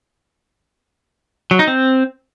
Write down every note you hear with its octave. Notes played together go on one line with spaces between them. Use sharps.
F#3
D#4
C4